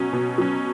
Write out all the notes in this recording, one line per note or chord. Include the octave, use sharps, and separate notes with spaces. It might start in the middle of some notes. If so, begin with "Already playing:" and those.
Already playing: B2 F#3 C#4
B2
F#3 C#4